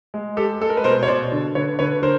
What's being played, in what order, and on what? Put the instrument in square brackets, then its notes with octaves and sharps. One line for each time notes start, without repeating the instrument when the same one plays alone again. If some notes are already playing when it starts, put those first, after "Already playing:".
[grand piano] G#3
G#3 G4 A4
G#3 A4
A#4
B4
B2 A#4 C5
C#5
B2 C5 D5
D3
D3 B4 C#5
D3 B4 C#5
D3 A#4 C5